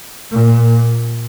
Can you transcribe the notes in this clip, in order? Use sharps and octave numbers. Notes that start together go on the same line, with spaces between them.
A#2